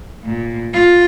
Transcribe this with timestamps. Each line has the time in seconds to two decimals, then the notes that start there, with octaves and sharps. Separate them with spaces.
0.24 A#2
0.73 F4